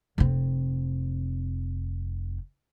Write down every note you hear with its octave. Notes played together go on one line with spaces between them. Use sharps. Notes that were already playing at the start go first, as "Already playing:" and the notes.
F1 C4